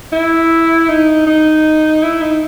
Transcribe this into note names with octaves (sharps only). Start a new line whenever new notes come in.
E4
D#4
D#4
E4
D#4